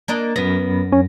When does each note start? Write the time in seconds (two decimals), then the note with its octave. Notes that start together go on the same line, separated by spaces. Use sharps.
0.08 A#3 D4 D#5
0.36 F#2 B3 A#6
0.92 C#4